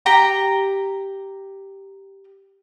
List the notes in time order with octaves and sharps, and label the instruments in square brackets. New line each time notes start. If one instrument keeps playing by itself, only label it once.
[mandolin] G4 G5 A#5